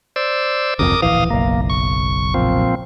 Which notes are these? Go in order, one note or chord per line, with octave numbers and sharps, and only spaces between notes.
C5 D5 E6
G1 C2 F2 A#4 D6 D#6
D1 A#1 E3 F5 D#6
F#1 B1 A#3
C#6
A#2 F3 C4